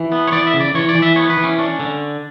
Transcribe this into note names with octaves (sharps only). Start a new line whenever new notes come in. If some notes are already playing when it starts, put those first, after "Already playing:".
Already playing: E3
B3
C#5
E3 D5
E5
C#3
D5
E3 C#5
D5
E3
E5
B3 C#5
B4
E3
C#4
C#4 D4
D3